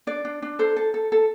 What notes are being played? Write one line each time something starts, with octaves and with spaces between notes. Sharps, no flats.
D4 D5
D4
D4
A4 C5
A4
A4
A4